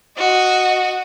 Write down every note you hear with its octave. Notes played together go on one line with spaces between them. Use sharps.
F#4 D#5